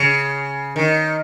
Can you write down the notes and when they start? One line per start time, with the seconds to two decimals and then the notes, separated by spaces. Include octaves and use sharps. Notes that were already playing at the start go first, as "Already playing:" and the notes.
Already playing: C#3
0.76 D#3